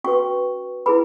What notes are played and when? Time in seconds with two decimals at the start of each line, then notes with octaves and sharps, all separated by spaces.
0.04 C#4 F#4 B4 C#6
0.86 E4 G#4 B4 B5